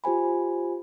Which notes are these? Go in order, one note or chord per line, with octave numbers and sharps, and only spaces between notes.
F4 G4 C5 G#5 B5